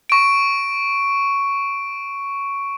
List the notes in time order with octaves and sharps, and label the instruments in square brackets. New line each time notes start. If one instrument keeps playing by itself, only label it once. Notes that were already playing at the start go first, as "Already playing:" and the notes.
[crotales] C#6 D7